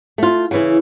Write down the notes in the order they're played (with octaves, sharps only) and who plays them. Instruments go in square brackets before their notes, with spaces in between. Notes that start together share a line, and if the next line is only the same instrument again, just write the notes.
[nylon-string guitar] A3 F4
C#3 E3 E4